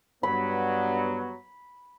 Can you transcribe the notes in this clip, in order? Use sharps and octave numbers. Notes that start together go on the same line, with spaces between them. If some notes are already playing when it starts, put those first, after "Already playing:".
G2 F#3 B3 B5